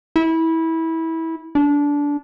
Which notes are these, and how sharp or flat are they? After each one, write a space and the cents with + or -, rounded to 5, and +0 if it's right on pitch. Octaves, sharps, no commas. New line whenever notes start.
E4 -20
D4 -20